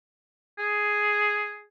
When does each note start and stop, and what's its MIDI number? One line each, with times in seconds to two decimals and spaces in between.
0.59 1.65 68